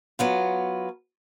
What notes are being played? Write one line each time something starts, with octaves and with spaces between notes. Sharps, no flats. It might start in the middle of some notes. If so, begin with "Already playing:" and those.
F#3 B3 F4